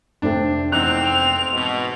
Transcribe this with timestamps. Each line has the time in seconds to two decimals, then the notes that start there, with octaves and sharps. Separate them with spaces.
0.22 F1 A3 C4 D4 G5
0.72 E2 C4 D#4 F#6 F7
1.54 G#2 B2